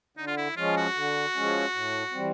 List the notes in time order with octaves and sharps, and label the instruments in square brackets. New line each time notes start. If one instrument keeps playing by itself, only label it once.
[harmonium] D3 [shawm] D#4
[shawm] F4
E4
[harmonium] F3 G#3 C#4 [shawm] F4
[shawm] F#4
[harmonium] D3
F3 G#3 C#4
A2
E3 G3 C4